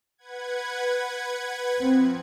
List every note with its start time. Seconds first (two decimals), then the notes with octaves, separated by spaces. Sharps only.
0.18 B4 F#5 G#6
1.79 F3 C4